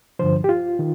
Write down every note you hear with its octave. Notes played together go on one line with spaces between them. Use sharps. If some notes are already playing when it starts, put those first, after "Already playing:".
G2 D3 F3 C5
G4
F4
D#3